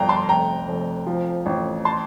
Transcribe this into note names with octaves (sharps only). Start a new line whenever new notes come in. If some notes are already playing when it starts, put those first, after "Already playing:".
Already playing: G1 F2 F5 G5 A#5
A5 C6
F1 G5 A#5
F1
F3
A1
A5 C6